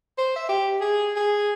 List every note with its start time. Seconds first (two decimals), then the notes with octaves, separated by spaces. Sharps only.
0.18 C5
0.36 E5
0.49 G4
0.81 G#4
1.16 G#4